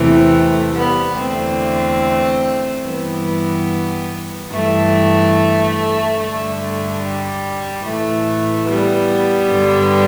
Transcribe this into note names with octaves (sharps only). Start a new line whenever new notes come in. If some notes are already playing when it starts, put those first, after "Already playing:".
Already playing: E2 C3 E3 A3
A3
G3 B3
E2 D3 A3 C4
G2 E3 G3 B3
G2 E3 A3
G2 D3 A3
A3
G3
A2 E3 A3
G3 B3
G2 D3